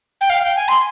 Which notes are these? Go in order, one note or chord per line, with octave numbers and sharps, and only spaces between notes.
G5
F5
G5
G#5
C6